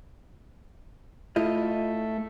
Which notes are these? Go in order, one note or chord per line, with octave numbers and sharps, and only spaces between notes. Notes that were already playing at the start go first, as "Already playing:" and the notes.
A3 E4 F4 D#5